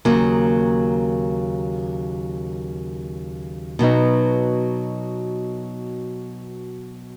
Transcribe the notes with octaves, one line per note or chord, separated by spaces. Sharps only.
D#2 C#3 F#3 A#3
B2 F#3 B3 D#4